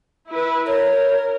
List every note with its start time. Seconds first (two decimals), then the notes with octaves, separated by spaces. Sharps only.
0.29 E4 B4
0.67 A#4 C#5